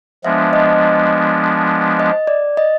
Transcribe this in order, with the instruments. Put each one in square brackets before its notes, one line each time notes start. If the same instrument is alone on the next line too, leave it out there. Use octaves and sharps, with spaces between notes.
[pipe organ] F3 G#3 B3 D4 [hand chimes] E5
[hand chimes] D#5
D#5
D5
D#5